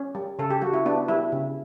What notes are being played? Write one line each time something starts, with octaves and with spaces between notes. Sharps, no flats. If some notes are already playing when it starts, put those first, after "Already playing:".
Already playing: C#4
G3
C#3 A4
G4
G3 F#4
E4
B3 D4
G3 E4
C#3